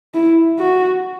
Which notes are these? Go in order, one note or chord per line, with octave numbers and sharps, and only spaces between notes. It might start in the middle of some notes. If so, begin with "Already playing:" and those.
E4
F#4